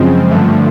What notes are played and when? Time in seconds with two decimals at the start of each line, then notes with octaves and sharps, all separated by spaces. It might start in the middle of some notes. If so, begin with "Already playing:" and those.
Already playing: F#2 C#3 F3 G#3 C4
0.30 G2 D3 F3 A3